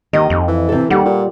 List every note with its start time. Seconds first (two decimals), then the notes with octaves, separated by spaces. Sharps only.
0.13 D#2 D#3 D#5
0.30 F2
0.48 E3
0.69 C3 A4
0.90 D#2 G3 F#5
1.05 A#2